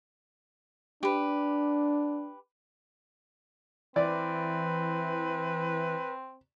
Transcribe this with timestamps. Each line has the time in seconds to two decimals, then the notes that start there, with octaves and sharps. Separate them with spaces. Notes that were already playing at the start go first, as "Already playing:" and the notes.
1.03 D4 G4 B4
3.96 E3 C4 B4 D5